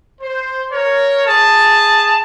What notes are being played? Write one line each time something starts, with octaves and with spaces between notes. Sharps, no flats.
C5
A#4 C#5
G#4 A5